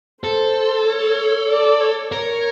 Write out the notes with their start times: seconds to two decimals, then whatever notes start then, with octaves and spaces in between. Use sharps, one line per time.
0.23 A4 C5
0.86 C#5
1.49 D5
1.80 C#5
2.12 A#4 C#5